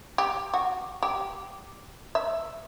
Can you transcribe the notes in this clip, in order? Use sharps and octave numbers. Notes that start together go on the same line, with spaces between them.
G4
F#4
G4
E5